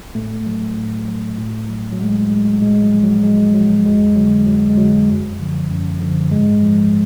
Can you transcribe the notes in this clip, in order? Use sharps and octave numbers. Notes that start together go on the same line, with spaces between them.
A2 A3
F#3
A2
F#3
A2
F#3
F#3
A2 G#3
F#3 G#3
A2 G#3
F#3
F3
F#3
A2 G#3
F3 F#3
F2 G#3
D3 F#3
F2 F#3
G#3
D3 F#3
F#2
D3 F3
F#2
D3 F3
G#2 G#3
F3